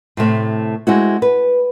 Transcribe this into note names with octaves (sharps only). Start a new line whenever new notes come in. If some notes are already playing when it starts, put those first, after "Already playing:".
A2 C3 A3 C4
G#3 A3 C4 E4 F#4
B4